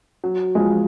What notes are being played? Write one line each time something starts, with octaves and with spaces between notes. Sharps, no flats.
F#3
F3 G#3